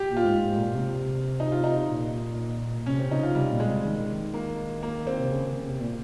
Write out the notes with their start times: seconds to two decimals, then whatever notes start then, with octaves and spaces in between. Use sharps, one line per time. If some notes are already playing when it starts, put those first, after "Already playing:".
Already playing: G4
0.09 A#2
0.17 F4
0.25 G#2
0.42 G#2
0.58 A#2
0.75 C3
1.40 D#4
1.52 F4
1.64 D#4
1.89 A#2
2.86 C3 C#4
2.99 C4
3.11 C#3 D#4
3.23 F4
3.35 C3 G3
3.52 A#2
3.60 G#3
3.68 C3
3.85 D#3
4.08 D#3
4.34 A#3
4.83 A#3
5.07 C4
5.20 C3
5.32 C#3
5.64 C3
5.81 A#2